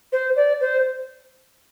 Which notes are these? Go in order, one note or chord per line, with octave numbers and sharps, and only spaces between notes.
C5
D5
C5